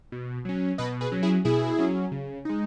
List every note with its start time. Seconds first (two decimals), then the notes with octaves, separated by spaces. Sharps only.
0.12 B2
0.45 F#3 C#4
0.78 B2 B4 D#5
1.01 G#4 B4
1.12 F#3 C#4
1.23 E4 G#4
1.45 B2 E4 G#4
1.78 F#3 C#4
2.12 C#3
2.45 G#3 D#4